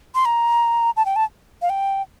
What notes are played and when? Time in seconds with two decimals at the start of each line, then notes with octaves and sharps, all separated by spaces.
0.15 C6
0.25 A#5
0.97 A5
1.06 G5
1.16 A5
1.62 F5
1.70 G5